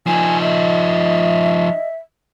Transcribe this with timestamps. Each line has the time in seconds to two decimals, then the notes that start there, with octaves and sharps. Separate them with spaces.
0.07 F3 D#4 G#5
0.42 D#5 E5